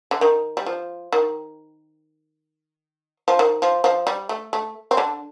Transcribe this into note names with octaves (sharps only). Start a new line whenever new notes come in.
D3
D#3
G3
F3
D#3
F3
D#3
F3
F3
G3
A3
A3
C4
D3 D4